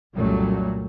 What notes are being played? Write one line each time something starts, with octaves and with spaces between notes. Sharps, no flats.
C2 F#2 A#2 F#3 G3 A3